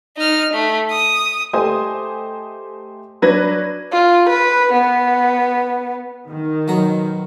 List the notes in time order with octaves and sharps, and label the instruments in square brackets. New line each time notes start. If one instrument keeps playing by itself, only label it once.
[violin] D#4 F6
A3
D#6
[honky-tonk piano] A3 G4 C5 D#5 G#5 D#6
F#3 D4 B4 G#6 A#6
[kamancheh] F4
B4
B3
[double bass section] D#3
[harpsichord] B1 F#3 A#5